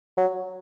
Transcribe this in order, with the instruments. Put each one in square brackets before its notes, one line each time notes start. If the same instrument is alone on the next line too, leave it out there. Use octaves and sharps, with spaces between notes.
[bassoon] F#3